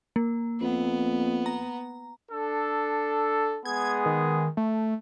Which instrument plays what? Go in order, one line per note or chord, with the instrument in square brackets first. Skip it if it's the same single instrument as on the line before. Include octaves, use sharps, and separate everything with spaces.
[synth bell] A#3
[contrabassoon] F2 [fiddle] B3
[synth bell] A#5
[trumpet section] D4 A4
[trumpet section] G#3 B3 G#4 [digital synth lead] G#6
[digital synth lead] D#3
A3